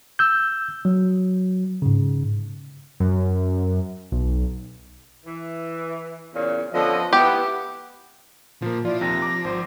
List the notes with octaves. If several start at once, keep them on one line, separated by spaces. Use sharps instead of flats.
E6 G6
F#3
G#2 C#3
F#2
B1
E3
E2 A#2 C#3
D3 F3 B3 C#4 D#5
B3 E4 G4
A#2 F3 A#3
F3 E4 F4 D5
D#2 C3 A#6
A#5 D6
G#1 C5